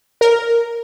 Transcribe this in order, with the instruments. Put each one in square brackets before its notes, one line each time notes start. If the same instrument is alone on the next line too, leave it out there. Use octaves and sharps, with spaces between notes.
[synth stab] A#4